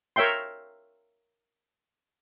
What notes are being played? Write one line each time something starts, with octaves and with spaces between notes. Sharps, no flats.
A#4 C#5 E5 G5 C6